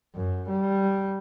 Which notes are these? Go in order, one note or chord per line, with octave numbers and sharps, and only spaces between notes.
F#2
G3